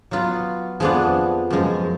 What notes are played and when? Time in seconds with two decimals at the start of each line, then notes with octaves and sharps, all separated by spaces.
0.11 F#3 B3 F4
0.80 F2 F3 B3 D4 G#4
1.50 F#2 F3 G#3